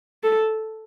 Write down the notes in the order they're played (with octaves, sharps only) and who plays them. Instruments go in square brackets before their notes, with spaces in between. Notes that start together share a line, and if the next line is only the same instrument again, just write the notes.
[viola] A4